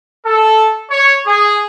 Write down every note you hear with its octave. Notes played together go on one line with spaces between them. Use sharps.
A4
C#5
G#4